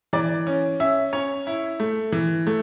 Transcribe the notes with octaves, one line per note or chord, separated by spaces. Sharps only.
E3 D5
C#4
C#4 E5
C#4 C#5
E4
A3
E3
A3